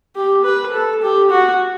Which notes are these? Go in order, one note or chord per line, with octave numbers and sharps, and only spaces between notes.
G4
B4
A4
G4
F#4